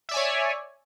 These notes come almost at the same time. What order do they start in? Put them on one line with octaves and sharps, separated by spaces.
E5 D5 G#5 C#5